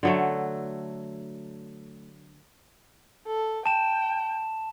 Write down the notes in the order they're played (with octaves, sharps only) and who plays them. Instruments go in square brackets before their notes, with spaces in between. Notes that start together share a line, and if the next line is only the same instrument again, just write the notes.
[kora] D3 F#3 A3
[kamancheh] A4
[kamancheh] G5 [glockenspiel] A5 E7